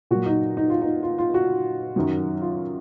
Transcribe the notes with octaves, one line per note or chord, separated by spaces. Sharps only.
A#2 F#3 F#4
D#4
D#4
F4
D#4
F4
F4
F#4
F#2 D#3 F#3
F4